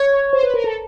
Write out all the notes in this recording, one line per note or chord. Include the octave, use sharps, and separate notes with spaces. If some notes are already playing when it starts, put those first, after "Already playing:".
Already playing: C#5
C5
B4
A#4
A4